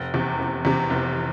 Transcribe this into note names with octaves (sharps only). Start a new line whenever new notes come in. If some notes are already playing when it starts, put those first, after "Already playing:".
Already playing: F1
E2 C3
F1
E2 C3
F1